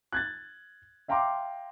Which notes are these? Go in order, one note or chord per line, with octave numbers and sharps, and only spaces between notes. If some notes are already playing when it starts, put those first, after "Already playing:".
F#6 G#6 A6
E5 F5 G5 A#5 C6 D6